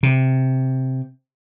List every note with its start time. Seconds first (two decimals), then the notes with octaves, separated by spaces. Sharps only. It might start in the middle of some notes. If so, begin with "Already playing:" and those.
0.03 C3